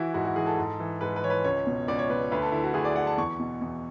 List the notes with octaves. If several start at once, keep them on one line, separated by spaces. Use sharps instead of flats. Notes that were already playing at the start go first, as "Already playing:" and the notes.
Already playing: E3 E4 F#4
G#2 F#4
F#4
E3 G#4
A4
G#2
E3
G#2 B4
B4
E3 C#5
B4
C#2 C#5
B2
C#2 D5
C#5
B2 B4
D2 B4
A4
D3 E4
F#4
D2 G#4
D5
D3 F#5
A5
E2 C#6
B2
E2